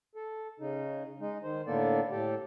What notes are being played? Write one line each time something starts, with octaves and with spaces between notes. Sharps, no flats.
A4
C#3 D#4
G#3 D#4
D#3 C5
A2 D3 A#3 B3 A4 D5
A2 G4 A4